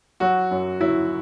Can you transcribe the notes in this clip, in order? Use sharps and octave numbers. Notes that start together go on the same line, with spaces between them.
F#3 F#4
F#2
F#3 E4